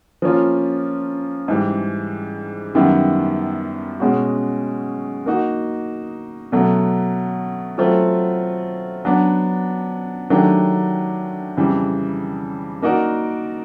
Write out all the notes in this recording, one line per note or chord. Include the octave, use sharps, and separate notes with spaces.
F3 A#3 C#4 F4
G#2 E3 G3
F#2 D#3 G3 B3 E4
B2 G#3 C#4 F#4
A#3 D#4 F#4
B2 F#3 A3
F#3 A3 C4 F4
F#3 B3 D4
D#3 F#3 A3 D4 G4
F2 C#3 E3 G3
A#3 D#4 F#4 A#4 D5